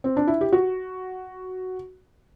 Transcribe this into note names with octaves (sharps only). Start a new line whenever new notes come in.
C4
D4
E4
G4
F#4